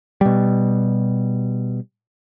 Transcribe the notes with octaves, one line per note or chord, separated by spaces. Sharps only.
B2 G3